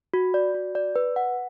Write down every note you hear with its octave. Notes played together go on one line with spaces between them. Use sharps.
F#4
D5
F#4
D5
B4
F#5